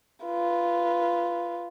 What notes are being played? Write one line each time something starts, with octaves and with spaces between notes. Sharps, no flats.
F4 B4